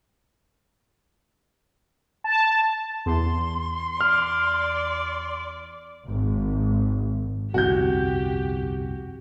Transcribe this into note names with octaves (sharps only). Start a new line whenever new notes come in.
A5
E2 C6
D5 F6
G#1
G1 C2 F2 F#4 G4 G6